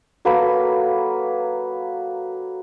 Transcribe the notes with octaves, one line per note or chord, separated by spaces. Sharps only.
F#3 A#3 A4 B4